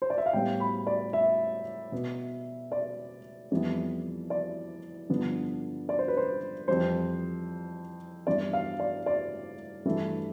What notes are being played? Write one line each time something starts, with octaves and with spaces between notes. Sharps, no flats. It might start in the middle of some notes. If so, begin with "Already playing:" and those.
C5
D5
E5
F5
A2 G3 B3 G5
B5
D5
E5
B2 B3
D5
F2 E3 G3 B3
D5
G2 D3 F3 B3
D5
C5
B4
C5
F2 E3 G3 C5
G2 E3 B3 D5
F5
D5
D5
G2 E3 A3